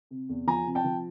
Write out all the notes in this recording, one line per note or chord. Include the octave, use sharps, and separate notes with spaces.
C3
E2
F3 G#5 A#5
C3
G5 A5
F3